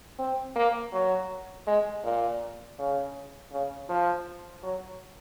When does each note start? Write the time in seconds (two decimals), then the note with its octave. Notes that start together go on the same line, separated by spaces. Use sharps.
0.19 C4
0.56 A#3
0.92 F#3
1.67 G#3
2.04 A#2
2.78 C#3
3.52 C#3
3.89 F3
4.63 F#3